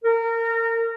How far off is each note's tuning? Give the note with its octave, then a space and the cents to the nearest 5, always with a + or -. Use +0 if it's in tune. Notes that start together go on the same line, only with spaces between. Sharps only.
A#4 -25